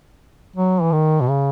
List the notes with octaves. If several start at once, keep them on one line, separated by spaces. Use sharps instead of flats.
F#3
E3
D#3
B2
C#3